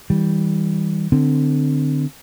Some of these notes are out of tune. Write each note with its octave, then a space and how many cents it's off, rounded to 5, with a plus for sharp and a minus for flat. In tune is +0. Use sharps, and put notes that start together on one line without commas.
E3 -40 G3 +0
D3 +15 C4 -20